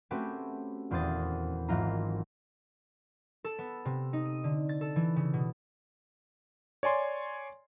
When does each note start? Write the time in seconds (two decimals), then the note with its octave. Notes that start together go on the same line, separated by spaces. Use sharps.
0.11 A3 C4 C#4 F#4 G4 B4
0.90 D#1 E2 C4 C5 D#6 A6
1.68 G#1 G#2 E3 F#3 F4 A#5
3.44 A4
3.59 B3
3.85 C3
4.13 D#4
4.26 D#7
4.44 D3
4.69 A6
4.81 A4
4.96 E3
5.16 C#3
5.34 B2
6.83 C#5 D5 G#5 C6